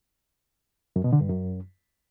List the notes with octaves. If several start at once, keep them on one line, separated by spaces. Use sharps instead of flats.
F#2
B2
D3
G2
F#2